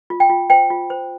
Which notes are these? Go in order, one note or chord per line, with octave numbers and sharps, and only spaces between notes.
F4
G5
F4
C5 G5
F4
C5